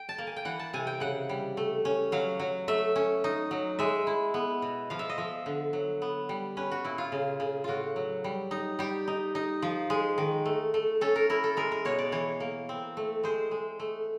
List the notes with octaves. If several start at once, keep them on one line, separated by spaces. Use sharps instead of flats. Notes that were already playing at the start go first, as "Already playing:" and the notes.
Already playing: G5
A5
A#3
G#5
G5
E3 F#5
A5
C3 G#5
G5
C#3 F#5
G3
A3
C#4
F#3 F5
F#3
A3 E5
C#4
D#4
F#3
G#3 E5
E4
B3
B2
F3 F5
E5
D#5
F3 E5
D3
F#3
B3
G3
C#4 B4
F#4
A#2 E4
F4
C#3
C#3
A2 F4 F#4
F#3
G3
D#4
G3 G4
D#4
D#4
F3
G#3
D#3
A3
A3
C#4 A4
A#4
E4 A#4
A4
G#3 A#4
A#4
B2 C#5
D5
E3 C#5
A#3
C4
A3
G#3 C5
G#3
A3